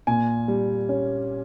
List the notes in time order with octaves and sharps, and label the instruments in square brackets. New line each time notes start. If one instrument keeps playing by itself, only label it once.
[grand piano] A#2 G#5
G3
C#4